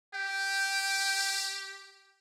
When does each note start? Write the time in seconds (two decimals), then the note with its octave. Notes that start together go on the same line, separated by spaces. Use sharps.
0.14 G4 G5